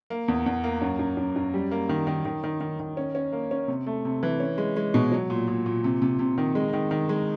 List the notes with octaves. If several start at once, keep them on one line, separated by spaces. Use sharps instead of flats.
A#3
E2
E2
A#3
F#2
F#2
F#2
F#2
G3
A#3
D#3
D#3
D#3
D#3
D#3
D#3
C#4
C#4
A#3
C#4
C3
A3
C3
E3
C#4
G#3
G#3
B2
F#3
A#2
A#2
A#2
C3
C3
C3
D#3
G#3
D#3
D#3
G#3